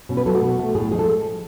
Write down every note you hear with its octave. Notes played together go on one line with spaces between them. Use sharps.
B2 C#4
B4
F#3 A3 A4
F#4
B2
A3
A2 G#4
A4
F3 G#3 G#4 A4